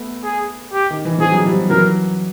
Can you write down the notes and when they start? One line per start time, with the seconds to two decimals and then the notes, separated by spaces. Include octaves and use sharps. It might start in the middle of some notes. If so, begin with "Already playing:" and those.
Already playing: A3 B3
0.24 G#4
0.73 G4
0.90 D#3
1.05 E3
1.18 F3 G#4
1.32 F#3
1.45 F3 G3
1.70 E3 F#3 A#4